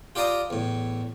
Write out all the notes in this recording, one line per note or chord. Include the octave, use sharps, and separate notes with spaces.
F4 G4 D5 F5 A#5 D#6
E2 A2